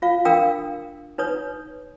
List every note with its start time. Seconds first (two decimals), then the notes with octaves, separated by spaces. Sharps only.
0.02 F4 F5
0.25 D4 A#4 F5 G5 D#6 E6
1.18 D#4 B4 C#5 D#6